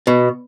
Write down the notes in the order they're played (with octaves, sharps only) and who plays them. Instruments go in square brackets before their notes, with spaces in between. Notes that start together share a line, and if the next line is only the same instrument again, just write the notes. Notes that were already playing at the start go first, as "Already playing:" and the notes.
[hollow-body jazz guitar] B2